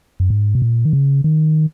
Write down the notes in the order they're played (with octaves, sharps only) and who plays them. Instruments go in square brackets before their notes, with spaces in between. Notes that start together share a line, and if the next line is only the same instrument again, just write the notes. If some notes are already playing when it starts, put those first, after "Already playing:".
[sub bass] F#2
G#2
B2
A#2
D#3
C#3
D#3